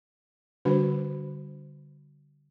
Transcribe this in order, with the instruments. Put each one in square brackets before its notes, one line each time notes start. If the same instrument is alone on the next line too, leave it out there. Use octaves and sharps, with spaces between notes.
[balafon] D3 G3 D4 F#4 B4 C5